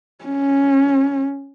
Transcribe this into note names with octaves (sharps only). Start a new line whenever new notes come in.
C#4